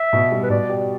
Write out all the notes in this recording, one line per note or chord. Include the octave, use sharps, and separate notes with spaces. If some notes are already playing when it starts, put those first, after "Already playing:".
Already playing: E5
B2
G3
B4
B2 D5
G4